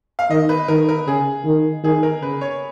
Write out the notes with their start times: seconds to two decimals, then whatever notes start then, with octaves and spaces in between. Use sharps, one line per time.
0.19 F5
0.31 D#3 D#5
0.49 B4
0.68 D#3 A#4
0.89 A#4
1.07 C#3 G#4
1.45 D#3
1.84 D#3 G#4
2.03 A#4
2.21 C#3 B4
2.41 C#5